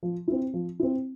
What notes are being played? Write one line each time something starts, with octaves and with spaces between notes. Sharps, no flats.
F3
C4 E4
F3
C4 E4